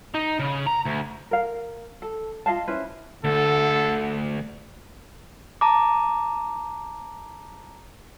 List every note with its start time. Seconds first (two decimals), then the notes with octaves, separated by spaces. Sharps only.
0.14 D#4
0.40 C#3
0.67 A#5
0.86 D2
1.31 A#4 F5
2.02 A4
2.46 F4 D#5 F5 A5
2.68 C#4 E4 B4 C5
3.24 D2 D3 A3 A4
5.61 A5 A#5 D6